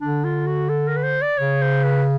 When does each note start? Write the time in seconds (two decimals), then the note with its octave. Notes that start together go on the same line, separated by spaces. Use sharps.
0.01 D3 D4
0.24 F4
0.47 F#4
0.70 A4
0.88 A#4
0.96 B4
1.04 C5
1.22 D5
1.38 C#3 C#5
1.62 C5
1.84 B4